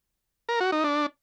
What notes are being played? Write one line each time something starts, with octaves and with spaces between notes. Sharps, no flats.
A#4
F#4
D#4
D4